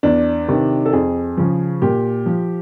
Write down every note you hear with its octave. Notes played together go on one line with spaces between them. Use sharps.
E2 D4
C3 D#3
A4
F2 G#4
C#3 F3
A#2 G4
F3